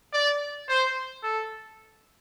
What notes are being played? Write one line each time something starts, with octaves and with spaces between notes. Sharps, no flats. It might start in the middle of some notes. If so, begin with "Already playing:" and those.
D5
C5
A4